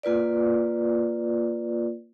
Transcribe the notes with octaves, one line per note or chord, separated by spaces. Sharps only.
A#3 F4 B4 D5